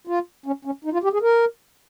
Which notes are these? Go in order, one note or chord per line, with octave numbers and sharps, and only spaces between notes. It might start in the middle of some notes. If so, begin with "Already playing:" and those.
F4
C#4
C#4
D#4
F4
G4
G#4
A#4